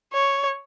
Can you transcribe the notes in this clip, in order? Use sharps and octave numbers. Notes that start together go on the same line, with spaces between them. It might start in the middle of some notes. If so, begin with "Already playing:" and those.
C#5